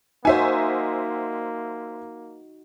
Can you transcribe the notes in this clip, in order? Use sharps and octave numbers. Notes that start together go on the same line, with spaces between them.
A#3 D#4 F#4 C5 E5 G#5